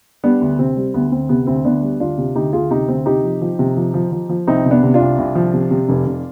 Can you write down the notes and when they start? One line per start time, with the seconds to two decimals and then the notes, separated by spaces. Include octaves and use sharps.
0.24 G3 B3 D4
0.41 D2
0.59 C3 C4
0.77 G3
0.94 D2 B3
1.12 D2 C4
1.29 C3 B3
1.47 D2 C4
1.65 D2 B3 D4
1.83 G3
2.00 D2 D4 F4
2.18 C3
2.35 D2 D#4 G4
2.53 D2 F4 G#4
2.70 C3 D#4 G4
2.88 D2 C4
3.06 C3 D#4 G4
3.24 F3
3.41 F3
3.59 C3
3.77 F3
3.94 F3
4.12 F3
4.29 F3
4.47 C2 C4 D#4
4.65 C3
4.71 B3 D4
4.83 C3
4.94 D4 F4
5.00 C2
5.18 C2
5.35 F3
5.54 C3
5.71 C3
5.89 F1
6.07 F1